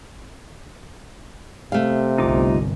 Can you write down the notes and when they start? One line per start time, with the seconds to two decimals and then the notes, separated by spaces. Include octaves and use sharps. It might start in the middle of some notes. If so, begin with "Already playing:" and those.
1.72 C3 A3 F5
2.18 G1 C2 D#4 F4 D6